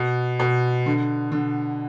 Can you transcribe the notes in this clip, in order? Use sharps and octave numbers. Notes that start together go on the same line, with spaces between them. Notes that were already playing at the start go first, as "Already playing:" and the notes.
Already playing: B2
B2
D3
D3